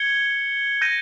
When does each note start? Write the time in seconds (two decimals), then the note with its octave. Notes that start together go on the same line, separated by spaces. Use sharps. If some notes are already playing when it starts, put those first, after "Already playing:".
Already playing: G#6 C#7 G7
0.81 G6 A#6 D#7